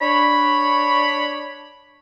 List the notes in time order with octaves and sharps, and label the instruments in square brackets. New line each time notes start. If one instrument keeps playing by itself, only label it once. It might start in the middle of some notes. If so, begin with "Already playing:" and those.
[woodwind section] D4 C#5 B5